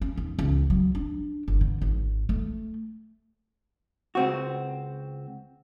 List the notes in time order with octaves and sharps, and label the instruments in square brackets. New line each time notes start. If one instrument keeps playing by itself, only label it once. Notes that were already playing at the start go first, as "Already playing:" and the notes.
[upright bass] C#4
D#2
C#2
F#3
D4
G1
D3
G#1
A3
[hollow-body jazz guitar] C#2 C4 F#4